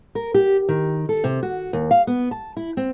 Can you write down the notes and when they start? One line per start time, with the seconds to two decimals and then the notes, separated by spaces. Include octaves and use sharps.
0.15 A#4
0.34 G4
0.69 D#3
1.09 A4
1.24 C3
1.43 F#4
1.73 D#2
1.91 F5
2.07 B3
2.31 A5
2.57 E4
2.77 C4